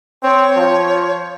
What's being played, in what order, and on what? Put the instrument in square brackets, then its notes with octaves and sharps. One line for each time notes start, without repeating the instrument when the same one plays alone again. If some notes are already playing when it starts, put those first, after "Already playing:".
[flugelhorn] C4 [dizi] C#5
[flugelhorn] F3